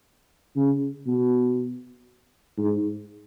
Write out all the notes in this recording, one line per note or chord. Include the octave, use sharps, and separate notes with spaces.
C#3
B2
G#2